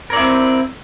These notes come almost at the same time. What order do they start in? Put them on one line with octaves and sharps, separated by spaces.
A#4 D5 E4 C4